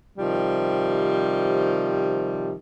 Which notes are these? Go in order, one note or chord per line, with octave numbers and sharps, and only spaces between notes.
C3 D#3 F3 G3